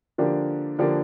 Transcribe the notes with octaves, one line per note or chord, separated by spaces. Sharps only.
D3 F3 A#3 D4 G4
D3 F3 A#3 D4 G4